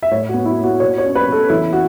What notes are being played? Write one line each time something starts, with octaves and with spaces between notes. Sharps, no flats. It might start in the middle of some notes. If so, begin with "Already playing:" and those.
E5
A2 C#5
F#4
B3
E4
B3
F#4
B2 C#5
C#5
C#4
B4
B2 A4
E3 E4
F#4